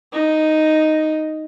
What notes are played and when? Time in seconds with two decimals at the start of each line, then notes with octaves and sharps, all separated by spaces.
0.13 D#4